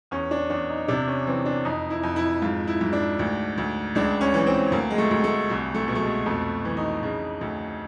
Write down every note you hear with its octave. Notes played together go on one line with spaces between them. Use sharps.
E2 C#4
D4
E2 D4
D#4
C3 D4
C#4
E3 C4
D4
F2 D#4
E4
F2
E4
G#2 F4
E4
G#2
D4
D2
D2
C#2 D4
C#4
E3
C4
D2 A#3
G#3
A3
D2
A3
C2
A3
B2
A3
G#3
F2 A3
E3
D#4
C#3
D2